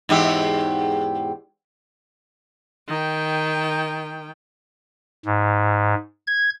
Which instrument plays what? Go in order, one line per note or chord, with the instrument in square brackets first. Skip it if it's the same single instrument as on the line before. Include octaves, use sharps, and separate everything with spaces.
[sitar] E2 G#2 G4
[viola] D#3 G5
[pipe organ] G#2
G#6